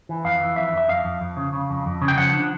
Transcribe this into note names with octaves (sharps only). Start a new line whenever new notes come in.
E3
F2 F5
E3
F2 E5
F2
E5
F2 F5
F2
F2
C#3
C#3
F2
F2
C#3
G5
F3 F#5
D4